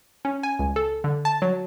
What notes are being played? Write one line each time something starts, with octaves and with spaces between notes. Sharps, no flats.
C#4
G#5
C#2
A4
D3
A5
F#3